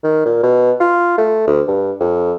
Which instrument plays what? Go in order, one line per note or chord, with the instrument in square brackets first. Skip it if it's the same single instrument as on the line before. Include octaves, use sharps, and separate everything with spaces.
[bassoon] D#3
A#2
B2
F4
A3
D2
G2
F2